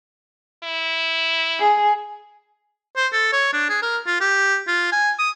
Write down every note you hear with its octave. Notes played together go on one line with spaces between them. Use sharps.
E4
G#4
C5
A4
C#5
D4
G#4
A#4
F4
G4
F4
G#5
D#6